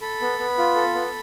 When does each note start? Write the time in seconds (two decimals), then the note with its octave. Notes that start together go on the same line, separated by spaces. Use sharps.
0.01 A4 B5
0.21 B3
0.39 B3
0.58 F4
0.75 A4
0.95 B3